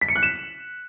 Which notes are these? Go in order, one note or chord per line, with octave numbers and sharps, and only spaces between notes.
B6
C#7
F#6
E7